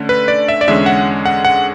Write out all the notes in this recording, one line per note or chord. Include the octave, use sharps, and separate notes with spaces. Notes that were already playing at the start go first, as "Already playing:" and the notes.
Already playing: D3 A3 C#4
B4
D5
E5
D5
E2 D3 G#3 C#4 E5
F#5
F#5
F#5